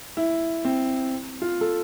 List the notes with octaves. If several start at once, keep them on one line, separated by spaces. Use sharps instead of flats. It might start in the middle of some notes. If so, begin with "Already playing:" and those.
E4
C4
F4
A4